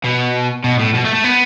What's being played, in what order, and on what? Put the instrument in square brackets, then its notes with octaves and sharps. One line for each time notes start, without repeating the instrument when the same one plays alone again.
[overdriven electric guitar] B2
B2
A2
B2
A3
A3
B3